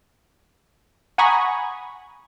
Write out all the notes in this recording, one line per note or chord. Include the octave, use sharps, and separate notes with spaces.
F#5 G#5 A#5 B5 C#6 D#6